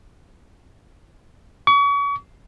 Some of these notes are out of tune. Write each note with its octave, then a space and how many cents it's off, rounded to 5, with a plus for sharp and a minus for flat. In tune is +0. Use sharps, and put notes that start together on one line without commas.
C#6 +35